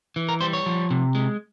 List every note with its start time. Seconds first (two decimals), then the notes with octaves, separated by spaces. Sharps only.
0.16 E3
0.29 A#4
0.41 G3 C5
0.53 C#5
0.66 F3
0.91 C3
1.15 G#3